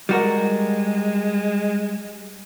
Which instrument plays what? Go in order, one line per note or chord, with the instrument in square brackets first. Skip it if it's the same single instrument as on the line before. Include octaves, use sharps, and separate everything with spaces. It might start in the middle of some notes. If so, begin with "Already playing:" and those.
[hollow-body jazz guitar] G3 F#4 A#4 [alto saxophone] G#3